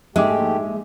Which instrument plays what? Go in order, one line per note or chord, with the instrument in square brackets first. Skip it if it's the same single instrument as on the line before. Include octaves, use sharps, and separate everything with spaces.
[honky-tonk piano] A#1 G#2 G#5 [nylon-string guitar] G#3 [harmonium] A3 G4 [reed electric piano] E5 D6